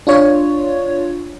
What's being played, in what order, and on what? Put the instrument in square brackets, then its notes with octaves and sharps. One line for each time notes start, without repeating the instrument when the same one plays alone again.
[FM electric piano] D4 F4 C#5